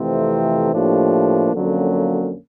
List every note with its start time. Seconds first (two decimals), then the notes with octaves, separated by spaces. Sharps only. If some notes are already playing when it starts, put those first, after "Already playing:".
Already playing: F2 C3 E3 A3 C4
0.72 A2 F3 A#3 D4 G4
1.53 F2 D3 F#3 A#3 C#4